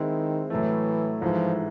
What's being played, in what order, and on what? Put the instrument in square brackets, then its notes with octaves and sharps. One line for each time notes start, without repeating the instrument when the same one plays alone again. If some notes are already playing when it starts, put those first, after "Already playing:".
Already playing: [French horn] D#3 [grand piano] G#3 C4 E4
[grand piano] A2 F#3 A3 [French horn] E3
[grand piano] G#2 E3 A3 [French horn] F3